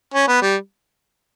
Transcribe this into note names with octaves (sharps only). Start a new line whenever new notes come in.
C#4
B3
G3